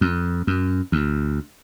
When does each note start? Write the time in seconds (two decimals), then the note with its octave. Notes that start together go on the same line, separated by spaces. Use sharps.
0.01 F2
0.47 F#2
0.92 D2